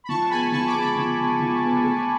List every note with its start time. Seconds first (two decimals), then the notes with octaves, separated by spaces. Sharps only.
0.04 B5
0.08 F3 A5 C#6
0.30 G#3 B3 G#5 B5
0.52 F3 A5 C#6
0.66 B5 D6
0.74 G#3 B3
0.81 B5 D6
0.96 F3
1.18 G#3 B3
1.40 F3
1.62 G#3 B3
1.83 A3